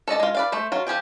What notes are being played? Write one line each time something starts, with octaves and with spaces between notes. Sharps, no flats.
A4 D5 D#5 A5
G#3 F4
B4 D5 F5
A3 C5
F#3 F4
F3 G4 G#4 G5